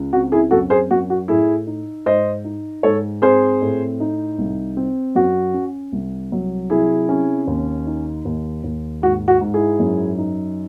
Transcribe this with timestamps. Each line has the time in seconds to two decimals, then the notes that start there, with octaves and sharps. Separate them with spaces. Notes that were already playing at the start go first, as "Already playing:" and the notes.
Already playing: C#2
0.13 C4 F#4
0.32 E4 G#4
0.51 F#2 F#4 A4
0.70 G#4 C5
0.91 F#2 F#4
1.10 F#4
1.28 A2 E4 G#4
1.67 D#4
2.06 G#2 C5 D#5
2.45 D#4
2.83 G#2 A4 C#5
3.22 C4 G#4 C5
3.61 A2
4.00 D#4
4.38 C2
4.77 C4
5.15 F#2 F#4
5.54 C#4
5.92 C2
6.32 F#3
6.70 C3 E4 G#4
7.09 C#4
7.47 D#2
7.86 D#4
8.25 D#2
8.64 D#2
9.02 G#2 F#4
9.28 F#4
9.41 G#2
9.54 E4 G#4
9.79 F#2
10.18 D#4